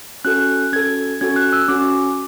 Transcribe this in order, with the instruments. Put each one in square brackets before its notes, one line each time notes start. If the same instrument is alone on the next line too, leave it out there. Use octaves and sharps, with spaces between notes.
[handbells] C#4 F#4 A4 F#6
C#4 F#4 A4 G#6
C#4 F#4 A4 G#6
F#6
E6
C#4 F#4 A4 D6